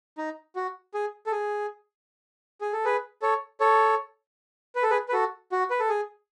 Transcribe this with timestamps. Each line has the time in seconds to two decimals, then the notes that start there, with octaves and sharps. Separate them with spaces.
0.18 D#4
0.56 F#4
0.94 G#4
1.26 A4
1.32 G#4
2.61 G#4
2.73 A4
2.85 G#4 B4
3.22 A4 C#5
3.60 A4 C#5
4.75 B4
4.83 A4
4.90 G#4 B4
5.09 B4
5.13 F#4 A4
5.52 F#4
5.70 B4
5.80 A4
5.89 G#4